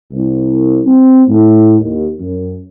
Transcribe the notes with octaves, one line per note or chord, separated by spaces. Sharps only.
C2
C4
A2
D#2
F#2